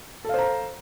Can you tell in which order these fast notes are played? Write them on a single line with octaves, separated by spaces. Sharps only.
A4 F5 C5 A#5